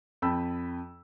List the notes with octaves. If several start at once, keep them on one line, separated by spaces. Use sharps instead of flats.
F2 G5 A5 B5 E6